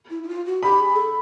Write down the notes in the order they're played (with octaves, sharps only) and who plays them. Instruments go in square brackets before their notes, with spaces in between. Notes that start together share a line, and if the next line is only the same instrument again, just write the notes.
[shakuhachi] E4
E4
F4
F#4
[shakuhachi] G4 [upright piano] B5
[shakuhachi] G#4
A4